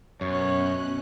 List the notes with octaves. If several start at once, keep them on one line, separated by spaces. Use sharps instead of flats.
F#2 B2 C#4 C#5 F#6